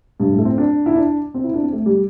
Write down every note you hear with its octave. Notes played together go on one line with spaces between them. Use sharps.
G2
A2
A3
C4
D4
E4
D4
C4
E4
D4
C4
A3
G3